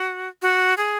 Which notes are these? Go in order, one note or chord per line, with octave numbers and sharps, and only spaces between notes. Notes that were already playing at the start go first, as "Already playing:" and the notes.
Already playing: F#4
F#4
G#4